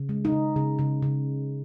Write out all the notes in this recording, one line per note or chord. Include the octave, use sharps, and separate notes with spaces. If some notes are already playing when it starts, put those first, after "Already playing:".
Already playing: C#3
G#3
D#4
C#3
C#3
C#3
C#3